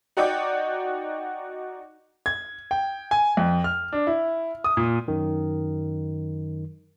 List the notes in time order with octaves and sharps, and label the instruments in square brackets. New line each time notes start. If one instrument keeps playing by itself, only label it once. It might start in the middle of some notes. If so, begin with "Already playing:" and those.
[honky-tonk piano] D#4 F#4 D5 F#5 G5 D6
[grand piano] G#6
G5
G#5
F2
F6
D4
E4
D#6
A#2
[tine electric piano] F#2 D#3